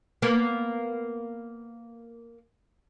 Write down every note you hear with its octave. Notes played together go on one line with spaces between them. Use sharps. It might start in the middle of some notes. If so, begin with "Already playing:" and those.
A#3 B3